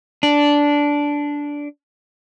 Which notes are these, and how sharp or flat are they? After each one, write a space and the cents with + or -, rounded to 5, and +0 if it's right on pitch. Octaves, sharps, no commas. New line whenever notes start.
D4 -10